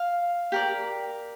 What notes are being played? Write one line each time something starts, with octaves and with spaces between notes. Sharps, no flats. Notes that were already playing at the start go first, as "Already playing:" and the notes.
Already playing: F5
G4 A#4 D5